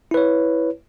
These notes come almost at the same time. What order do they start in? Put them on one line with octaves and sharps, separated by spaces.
E4 B4 C#5